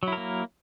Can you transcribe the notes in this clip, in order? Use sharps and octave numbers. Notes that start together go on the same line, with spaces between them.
F#3 A#3 E4 A#4